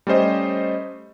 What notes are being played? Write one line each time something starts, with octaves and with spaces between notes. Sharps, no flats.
G3 A3 C#4 C5 D#5